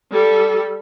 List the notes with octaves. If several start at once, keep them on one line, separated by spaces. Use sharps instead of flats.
G3 A4